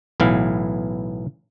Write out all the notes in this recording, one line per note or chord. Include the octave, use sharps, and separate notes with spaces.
B1 A2 E3 B3 F5